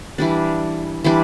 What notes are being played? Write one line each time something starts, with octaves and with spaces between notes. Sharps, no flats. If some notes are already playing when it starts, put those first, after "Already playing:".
E3 G3 D4
E3 G3 D4 C6